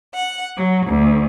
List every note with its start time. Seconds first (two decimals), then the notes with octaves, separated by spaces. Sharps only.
0.15 F#5
0.56 F#3
0.86 D2